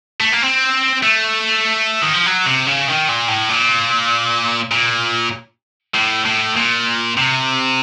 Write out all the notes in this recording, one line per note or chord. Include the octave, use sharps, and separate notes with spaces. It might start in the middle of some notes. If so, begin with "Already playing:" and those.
A3
A#3
C4
A3
D#3
F3
F#3
C3
C#3
D#3
A#2
A2
A#2
A#2
A2
A2
A#2
C3